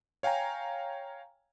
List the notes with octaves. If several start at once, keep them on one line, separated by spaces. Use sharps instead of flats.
C#5 F5 G5 G#5 A#5